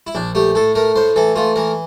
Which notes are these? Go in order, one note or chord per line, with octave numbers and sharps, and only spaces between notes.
E4
A#1 D4
A3 G4
A2 A4
A3 A#4
A2 C5
E3 A4
A3 F4
E3 A#4